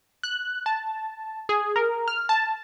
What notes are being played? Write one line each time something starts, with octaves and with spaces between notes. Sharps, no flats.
F#6
A5
G#4
A#4
F6
A5